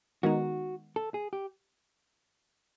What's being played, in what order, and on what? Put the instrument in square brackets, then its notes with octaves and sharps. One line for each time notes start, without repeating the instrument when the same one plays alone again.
[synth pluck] D#3 G#3 B3 D#4 [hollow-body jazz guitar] F#4
[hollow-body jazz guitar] A4
G#4
G4